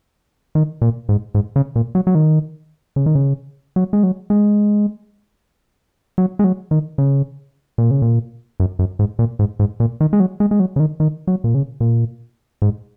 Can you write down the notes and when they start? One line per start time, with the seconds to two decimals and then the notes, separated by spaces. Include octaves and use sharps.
0.55 D#3
0.82 A#2
1.09 G#2
1.35 G#2
1.56 C#3
1.76 A#2
1.95 F#3
2.07 F#3
2.15 D#3
2.96 C#3
3.06 D#3
3.15 C#3
3.76 F#3
3.93 G#3
4.03 F#3
4.30 G#3
6.18 F#3
6.39 G#3
6.44 F#3
6.71 D#3
6.98 C#3
7.78 A#2
7.91 C#3
8.02 A#2
8.60 F#2
8.79 F#2
8.99 G#2
9.19 A#2
9.39 G#2
9.59 G#2
9.80 A#2
10.01 D#3
10.13 G#3
10.20 F#3
10.40 G#3
10.51 G#3
10.60 F#3
10.76 C#3
10.80 D#3
11.00 D#3
11.27 F#3
11.44 A#2
11.55 C#3
11.80 A#2
12.62 G#2